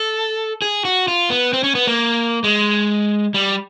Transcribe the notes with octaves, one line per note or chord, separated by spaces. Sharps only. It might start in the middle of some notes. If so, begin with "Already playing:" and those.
Already playing: A4
G#4
F#4
F4
B3
C4
C#4
B3
A#3
G#3
G3